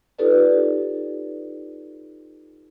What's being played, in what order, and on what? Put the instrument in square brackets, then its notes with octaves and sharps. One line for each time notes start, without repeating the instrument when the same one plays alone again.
[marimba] D#4 F4 G4 A4 B4 D5